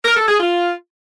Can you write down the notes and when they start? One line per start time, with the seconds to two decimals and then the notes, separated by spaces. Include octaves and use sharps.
0.05 A#4
0.17 A4
0.28 G#4
0.40 F4